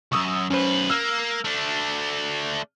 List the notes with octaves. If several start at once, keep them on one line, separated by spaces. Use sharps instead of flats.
C#2 F#2 C#6 D#6 E6
F#2 C#4 B4 C5
A#3 E6 F6
A3 D4